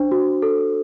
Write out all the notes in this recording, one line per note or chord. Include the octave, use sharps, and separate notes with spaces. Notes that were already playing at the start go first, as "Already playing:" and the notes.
Already playing: D4 C5
F#4
A4